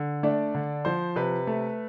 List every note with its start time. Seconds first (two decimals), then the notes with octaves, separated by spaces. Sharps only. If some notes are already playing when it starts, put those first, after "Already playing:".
Already playing: D3
0.23 A3 D4 D5
0.54 D3
0.85 F3 C5
1.16 C3 B4
1.47 A3